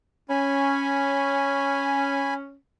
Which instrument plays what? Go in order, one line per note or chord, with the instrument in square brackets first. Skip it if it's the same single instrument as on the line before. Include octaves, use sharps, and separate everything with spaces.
[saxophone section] C#4 [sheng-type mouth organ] G#5 B5